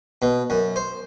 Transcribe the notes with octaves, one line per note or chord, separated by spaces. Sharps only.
B2
F#2
C5